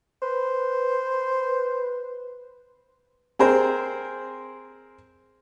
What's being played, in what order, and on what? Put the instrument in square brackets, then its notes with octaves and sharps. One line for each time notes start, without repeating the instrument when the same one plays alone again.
[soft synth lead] B4 [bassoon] C5
[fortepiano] C4 G#4 A#4 C5